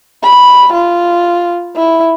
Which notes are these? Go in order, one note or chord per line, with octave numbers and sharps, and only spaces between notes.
B5
F4
E4